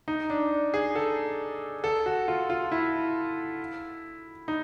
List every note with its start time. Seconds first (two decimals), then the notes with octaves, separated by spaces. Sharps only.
0.08 D#4
0.30 D4
0.74 G#4
0.95 A4
1.84 A4
2.06 F#4
2.28 F4
2.50 F4
2.72 E4
4.48 D#4